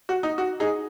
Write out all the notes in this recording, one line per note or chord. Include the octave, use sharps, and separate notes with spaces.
F#4
D#4
F#4
D#4 G#4